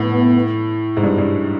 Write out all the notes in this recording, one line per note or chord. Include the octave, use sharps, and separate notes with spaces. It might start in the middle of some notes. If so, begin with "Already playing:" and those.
Already playing: A2 B3
G#2
G2
G2